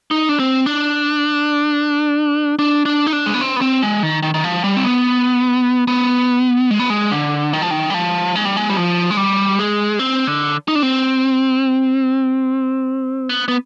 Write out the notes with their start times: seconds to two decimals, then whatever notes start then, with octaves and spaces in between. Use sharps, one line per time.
0.11 D#4
0.29 D4
0.40 C4
0.66 D4
2.59 D4
2.85 D4
3.07 D#4
3.13 D4
3.26 G#3
3.34 B3
3.41 C4
3.56 B3
3.61 C4
3.82 G#3
4.03 D#3
4.23 D#3
4.34 D#3
4.44 F3
4.64 G3
4.77 C4
4.84 B3
5.88 B3
6.71 G#3
6.79 B3
6.90 G#3
7.11 D3
7.53 D#3
7.62 F3
7.71 D#3
7.90 G3
7.94 F3
8.36 G#3
8.45 G3
8.57 G#3
8.69 G3
8.77 F3
9.11 G#3
9.17 G3
9.59 G#3
9.99 C4
10.27 D3
10.68 D#4
10.75 D4
10.83 C4
13.29 B3
13.48 B3